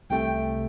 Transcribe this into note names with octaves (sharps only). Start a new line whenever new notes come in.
C2 C3 A3 G5